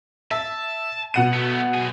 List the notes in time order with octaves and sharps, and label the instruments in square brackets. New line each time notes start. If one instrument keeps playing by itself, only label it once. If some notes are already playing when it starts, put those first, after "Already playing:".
[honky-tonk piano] E5 [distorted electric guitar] A5
[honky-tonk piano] B2 F#5 D#7
[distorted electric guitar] A3 B3
F#2 G#4